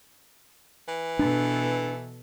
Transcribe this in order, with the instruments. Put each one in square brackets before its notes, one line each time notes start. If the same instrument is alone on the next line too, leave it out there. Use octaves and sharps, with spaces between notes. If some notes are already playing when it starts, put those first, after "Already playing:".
[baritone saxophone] E3
[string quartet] B2 A4 [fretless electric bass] D4